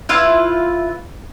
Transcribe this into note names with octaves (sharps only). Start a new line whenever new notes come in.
E4 F4 B4 F5